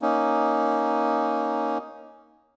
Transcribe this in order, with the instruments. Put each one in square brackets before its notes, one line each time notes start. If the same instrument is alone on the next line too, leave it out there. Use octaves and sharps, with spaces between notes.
[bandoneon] A#3 C#4 D#4